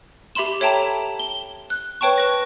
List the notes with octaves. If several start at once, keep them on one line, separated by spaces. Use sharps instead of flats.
G4 E5 B5 C6 E7
A4 C#5 E5 G5 A5 A#5
G7
F#6
B4 C#5 G5 A5 C#6
B4 A#6